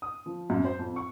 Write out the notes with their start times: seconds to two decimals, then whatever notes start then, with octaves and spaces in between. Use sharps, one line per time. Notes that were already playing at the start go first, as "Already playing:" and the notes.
0.02 D#6
0.26 F3
0.50 F#2
0.65 C5
0.79 F2
0.96 C#6